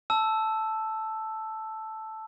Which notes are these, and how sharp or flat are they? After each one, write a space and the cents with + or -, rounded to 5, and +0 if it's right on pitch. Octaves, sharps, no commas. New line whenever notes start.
A5 +0 E6 +0